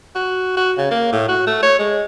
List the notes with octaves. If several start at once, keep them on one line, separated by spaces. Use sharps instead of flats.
F#4
F#4
C#3
A#3
A2
F#4
A3
C#5
G#3